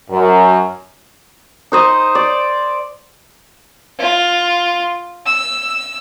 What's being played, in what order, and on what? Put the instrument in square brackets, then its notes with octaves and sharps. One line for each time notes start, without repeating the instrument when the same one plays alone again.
[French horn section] F#2
[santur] D#4 C5 D#5
D5
[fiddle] F4
E6